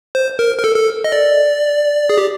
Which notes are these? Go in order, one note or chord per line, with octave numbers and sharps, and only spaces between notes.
C5
A#4
A#4
A4
A4
D#5
D5
G#4
G4